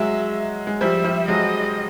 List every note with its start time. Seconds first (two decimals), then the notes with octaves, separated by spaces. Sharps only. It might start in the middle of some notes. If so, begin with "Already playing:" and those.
Already playing: F#3 G#3 E5
0.67 G#3
0.81 F3 G3 E5
1.04 F3 G3
1.28 F#3 G#3 D#5